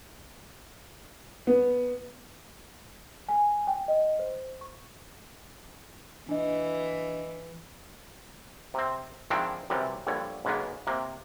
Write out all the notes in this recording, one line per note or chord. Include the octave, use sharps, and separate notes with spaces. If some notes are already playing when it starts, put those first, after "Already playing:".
B3
G#5
G5
D#5
C5
C#6
E3 D4 D#5
C3 C4
D#3 F3 G#3 C4 D4 E4
F#2 C3 E3 G3
A#1 G2 D3 C#5
B1 C#3 G#3 A#3 B3
C3 A#3